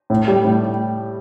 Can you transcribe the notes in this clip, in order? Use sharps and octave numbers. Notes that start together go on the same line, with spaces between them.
A2
G3
A2